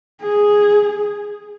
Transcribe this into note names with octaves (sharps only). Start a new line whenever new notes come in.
G#4